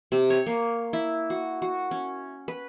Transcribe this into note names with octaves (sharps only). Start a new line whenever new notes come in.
C3
C#5
A#3
E4
F#4
F#4
C#4
B4